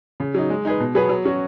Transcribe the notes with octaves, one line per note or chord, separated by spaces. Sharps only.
C#3
F#3 D#4
G#3
D#4 G#4 B4
B2
F#3 B3 G#4 B4
F#3
C#4 F#4